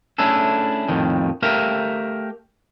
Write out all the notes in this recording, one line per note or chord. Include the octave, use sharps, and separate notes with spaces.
A3 C#4 D4 E4 G#4 A4
F2 A2 D#3
A3 G4 A#4 E5 F5